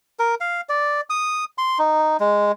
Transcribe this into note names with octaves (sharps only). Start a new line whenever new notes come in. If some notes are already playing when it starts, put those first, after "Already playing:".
A#4
F5
D5
D#6
C6
D#4
G#3